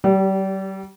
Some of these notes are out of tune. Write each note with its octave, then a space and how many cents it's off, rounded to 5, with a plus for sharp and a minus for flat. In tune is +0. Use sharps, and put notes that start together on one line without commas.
G3 -35 G4 +0